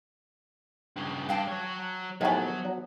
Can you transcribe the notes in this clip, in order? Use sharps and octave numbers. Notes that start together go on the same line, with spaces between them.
G2 C#3
G2 F5 G5 A5
F#3 C#5
D#2 A2 F3 F#3 B3 G#5
F#3